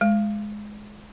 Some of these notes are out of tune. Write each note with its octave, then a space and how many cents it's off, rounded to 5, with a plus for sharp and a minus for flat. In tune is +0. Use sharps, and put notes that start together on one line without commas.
G#3 +10